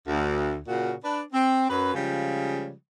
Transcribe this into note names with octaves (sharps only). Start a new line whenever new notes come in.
D2
A#2 C#3 F#4
D4 B4
C4
F#2 B4
C#3 F3 G3 G#3